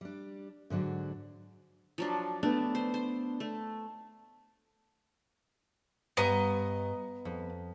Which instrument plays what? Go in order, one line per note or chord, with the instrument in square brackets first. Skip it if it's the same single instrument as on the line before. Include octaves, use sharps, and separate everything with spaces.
[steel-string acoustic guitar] G3 D4
G#2 D3 F#3 D4
[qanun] F3 F#3 D4
[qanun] A3 [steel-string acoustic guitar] B3 D4
[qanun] C5
C5
A3
[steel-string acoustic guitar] G2 [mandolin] B3 D#5 A#5
[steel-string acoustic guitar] F2